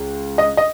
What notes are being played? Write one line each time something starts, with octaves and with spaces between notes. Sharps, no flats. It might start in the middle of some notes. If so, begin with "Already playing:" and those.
Already playing: C#2
D#5
D#5